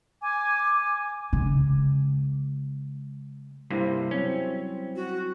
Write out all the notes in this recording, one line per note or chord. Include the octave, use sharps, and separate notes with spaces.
G#5 D6
C#3 G#3
G2 C3 G3 A#3 E4 C5
F#3 C4 C#4
F#4